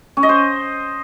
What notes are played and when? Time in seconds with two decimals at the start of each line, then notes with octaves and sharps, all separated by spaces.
0.17 C#4
0.23 D#5
0.29 C5